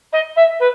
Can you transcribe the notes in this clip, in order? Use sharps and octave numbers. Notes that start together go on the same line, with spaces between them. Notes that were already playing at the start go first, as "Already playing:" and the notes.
D#5
E5
B4